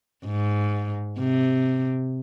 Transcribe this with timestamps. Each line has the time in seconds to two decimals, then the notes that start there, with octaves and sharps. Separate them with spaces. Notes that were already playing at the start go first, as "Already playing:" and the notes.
0.26 G#2
1.19 C3